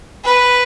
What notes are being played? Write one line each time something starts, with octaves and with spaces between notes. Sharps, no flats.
B4